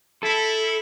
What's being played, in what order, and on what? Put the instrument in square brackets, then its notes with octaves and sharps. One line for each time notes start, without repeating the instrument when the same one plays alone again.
[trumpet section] E4 [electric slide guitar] A4